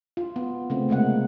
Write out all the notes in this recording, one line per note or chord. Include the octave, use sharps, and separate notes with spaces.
F4
B3
C#3 A3 C4
C3 G#3 A#3 F#5